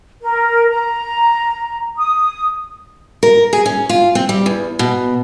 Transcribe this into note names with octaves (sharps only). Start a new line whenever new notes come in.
A#4
A#5
D#6
A#4
G#4
C#4
F4
C4
G3
E2
B2